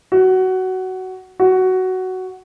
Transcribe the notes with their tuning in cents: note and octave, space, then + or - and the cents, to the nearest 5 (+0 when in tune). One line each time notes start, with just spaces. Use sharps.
F#4 +15
F#4 +10